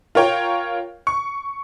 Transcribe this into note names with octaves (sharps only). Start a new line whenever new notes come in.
F4 A#4 C#5 G5
C#6